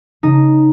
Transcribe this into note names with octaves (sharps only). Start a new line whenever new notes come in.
C#3 D#4